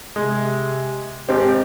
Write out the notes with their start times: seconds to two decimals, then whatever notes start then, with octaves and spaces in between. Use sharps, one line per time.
0.16 C3 G#3
1.29 G#1 C4 G4